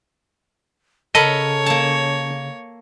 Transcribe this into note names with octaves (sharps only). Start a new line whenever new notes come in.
C#3 A4 A#4 C#5 D#5 B5
A#3 A5